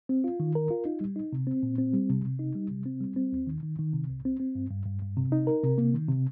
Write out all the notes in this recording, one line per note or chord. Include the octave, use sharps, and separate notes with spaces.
C4
F4
D#3
A#4
F4
D#4
G3
D#4
C3
C4
A#2
C4
G3
C3
C3
D#4
G3
C3
C4
G3
C4
D#2
D#3
D#3
D#3
C3
C2
C4
C4
G2
G2
G2
G2
C3
D#4
A#4
C3
A#3
D#3
C3